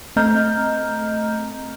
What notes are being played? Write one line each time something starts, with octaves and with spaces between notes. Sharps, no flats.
A3 C4 D#5 A#5 F6 G6